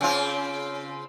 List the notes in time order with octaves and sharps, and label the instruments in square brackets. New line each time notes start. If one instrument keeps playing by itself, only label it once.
[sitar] C#3 C4 F4